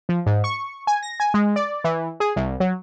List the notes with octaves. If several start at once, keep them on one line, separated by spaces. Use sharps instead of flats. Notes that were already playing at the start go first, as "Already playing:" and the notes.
F3
G#2
C#6
G#5
A#6
G#5
G#3
D5
E3
G#4
C2
F#3